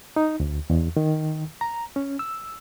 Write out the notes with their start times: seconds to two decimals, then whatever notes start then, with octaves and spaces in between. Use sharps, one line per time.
0.16 D#4
0.40 D2
0.70 E2
0.97 D#3
1.61 A#5
1.96 C#4
2.19 E6